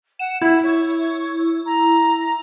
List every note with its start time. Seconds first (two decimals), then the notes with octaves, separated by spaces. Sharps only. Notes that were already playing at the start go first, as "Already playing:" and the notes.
0.19 F#5 E7
0.42 E4 E5
0.63 C#5
1.66 A#5